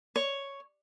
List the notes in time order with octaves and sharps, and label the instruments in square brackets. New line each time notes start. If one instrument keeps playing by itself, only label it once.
[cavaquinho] C#5